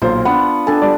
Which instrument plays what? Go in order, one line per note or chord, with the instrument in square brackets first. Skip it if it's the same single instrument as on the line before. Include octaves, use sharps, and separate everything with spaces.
[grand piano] B1 A#2 C5 [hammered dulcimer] F4
[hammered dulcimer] B3 D4 [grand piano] F#5
[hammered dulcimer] D4 A4 [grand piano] G#5
[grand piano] G3 D5